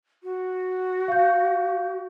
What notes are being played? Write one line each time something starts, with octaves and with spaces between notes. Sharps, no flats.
F#4
F5 G6